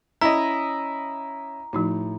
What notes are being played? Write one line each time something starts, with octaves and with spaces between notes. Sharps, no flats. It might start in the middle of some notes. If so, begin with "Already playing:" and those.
C#4 E4 D#5 A#5
A2 F3 D#4 F#4